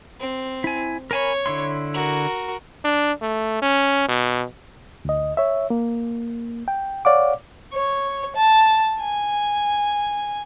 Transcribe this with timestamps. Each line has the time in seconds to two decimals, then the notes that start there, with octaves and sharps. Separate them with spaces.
0.20 C4
0.64 E4 G#5
1.11 A#4 C#5 G#5 B5
1.46 D3 E4 C6
1.94 F#4 A#4
2.84 D4
3.22 A3
3.62 C#4
4.09 B2
5.05 D2 D#5
5.37 C#5 E5
5.70 A#3
6.68 G5
7.05 C#5 D5 F5 F#5 D6
7.74 C#5
8.36 A5
9.01 G#5